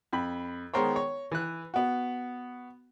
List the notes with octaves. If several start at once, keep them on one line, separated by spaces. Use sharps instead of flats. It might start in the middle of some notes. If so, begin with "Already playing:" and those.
F2 B5
D#3 G#3 B3 A#4 C5 C#5
C#5
E3 F#6
B3 F#4